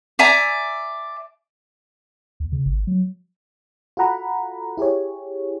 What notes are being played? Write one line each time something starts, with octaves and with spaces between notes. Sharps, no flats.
D5 E5 G#5 A#5
D#2
C#3
G#1
F#3
F4 F#4 A4 F#5 A#5 B5
E4 G4 G#4 C#5